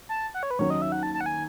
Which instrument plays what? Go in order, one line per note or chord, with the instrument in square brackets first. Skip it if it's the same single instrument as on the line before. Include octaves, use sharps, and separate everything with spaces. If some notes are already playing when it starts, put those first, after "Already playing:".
[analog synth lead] A5
F#5
C#5
B4
[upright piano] D#2 D#3 F#3 C#4 [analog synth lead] C#5
[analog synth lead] D#5
E5
F#5
A5
A5
F#5
G#5